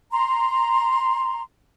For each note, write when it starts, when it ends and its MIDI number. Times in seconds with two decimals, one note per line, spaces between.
0.11 1.42 82
0.11 1.42 84